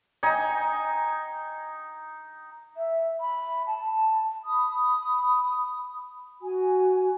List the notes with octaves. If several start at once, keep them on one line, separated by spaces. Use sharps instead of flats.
D#4 G5 G#5
E5
B5
A5
B5 D#6
F#4 G#5